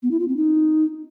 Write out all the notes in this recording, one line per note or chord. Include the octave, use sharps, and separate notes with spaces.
B3
E4
F4
C4
D#4